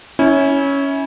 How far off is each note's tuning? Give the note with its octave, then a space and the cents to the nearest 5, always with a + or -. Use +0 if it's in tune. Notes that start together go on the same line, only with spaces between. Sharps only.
C#4 +5 E4 -25